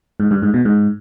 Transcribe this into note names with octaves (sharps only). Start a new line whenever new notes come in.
G#2
G2
G#2
B2
G#2